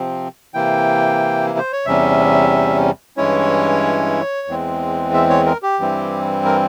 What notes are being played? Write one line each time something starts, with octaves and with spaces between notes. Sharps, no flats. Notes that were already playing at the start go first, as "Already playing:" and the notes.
Already playing: C3 F3 C4
C3 E3 A#3 E4 G5
C5
C#5
E2 C3 G3 C#4 E5
G2 E3 G#3 C#4 E4 C#5
E2 E3 G#3 C4
E5
C#5
A#4
G4
G2 E3 G3 C4 E4
A#4